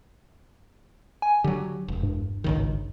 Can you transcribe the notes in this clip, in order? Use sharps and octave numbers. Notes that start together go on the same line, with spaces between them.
G#5
D3 F#3 G4
E1
G2
G#1 C#2 D#3